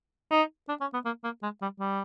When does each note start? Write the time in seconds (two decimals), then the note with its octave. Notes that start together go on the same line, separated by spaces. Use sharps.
0.31 D#4
0.69 D4
0.81 C#4
0.93 B3
1.05 A#3
1.24 A#3
1.43 G#3
1.62 G3
1.80 G3